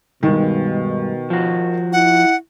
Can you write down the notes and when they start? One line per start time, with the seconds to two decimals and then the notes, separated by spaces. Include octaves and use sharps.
0.23 G2 B2 D#3 G#3
1.30 F3 F#4
1.93 E4 F#5